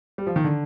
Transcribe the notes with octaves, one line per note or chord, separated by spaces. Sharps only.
G3
F3
D#3
D3